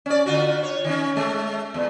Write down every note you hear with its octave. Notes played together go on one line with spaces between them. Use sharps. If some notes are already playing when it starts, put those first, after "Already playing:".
C#4 D5
D3 F4 F#4
C#5
D#3 C#4
G#3 A3
E2 A#2